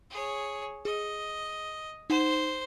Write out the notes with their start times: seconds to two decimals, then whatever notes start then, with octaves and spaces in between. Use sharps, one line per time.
0.10 G#4 C#5
0.85 G#4 D#5
2.10 D#4 C5 F#5 E7